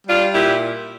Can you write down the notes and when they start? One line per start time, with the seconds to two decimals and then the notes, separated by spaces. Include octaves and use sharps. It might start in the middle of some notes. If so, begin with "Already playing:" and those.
0.07 G3 D4 F4
0.34 A#2 E4 G4